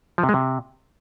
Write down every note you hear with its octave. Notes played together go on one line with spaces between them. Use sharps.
F3
C3
G#3
C3